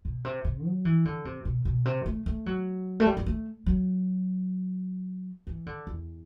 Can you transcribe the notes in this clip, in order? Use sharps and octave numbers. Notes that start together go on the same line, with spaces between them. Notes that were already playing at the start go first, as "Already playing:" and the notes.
B2
C3
C3
F#3
E3
D3
C3
B2
B2
C3
A3
A3
F#3
A3
G3
G3
A3
F#3
E3
D3
E2